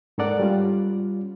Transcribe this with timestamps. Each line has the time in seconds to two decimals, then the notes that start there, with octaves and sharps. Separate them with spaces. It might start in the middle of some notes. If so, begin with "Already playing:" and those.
0.18 G#2 C#4 A4 A#4 D5 F#5
0.40 G3 C#4 F4